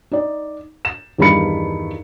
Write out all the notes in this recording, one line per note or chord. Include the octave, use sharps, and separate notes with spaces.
D#4 D5
E7
E2 G2 D#3 G3 B5 C#7